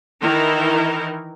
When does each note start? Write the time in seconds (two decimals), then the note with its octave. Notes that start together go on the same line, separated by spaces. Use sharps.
0.21 D#3 E3 D#4 E4 A#4